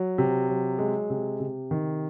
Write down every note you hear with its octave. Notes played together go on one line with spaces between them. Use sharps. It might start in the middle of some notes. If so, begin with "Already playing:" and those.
Already playing: F#3
C3
F#3
G#3
C3
C3
D#3